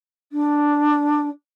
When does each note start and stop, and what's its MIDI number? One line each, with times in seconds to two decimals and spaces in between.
0.32 1.28 62